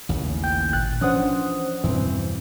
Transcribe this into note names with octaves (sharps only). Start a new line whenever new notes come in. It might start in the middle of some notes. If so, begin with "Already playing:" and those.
A1 D#2 C#3
G5 G6
G#1 A#2 F#6 A6
E3 F3 C#4 D4 C5 F#5 D#6 F#6
E2 G2 B2 E3 C4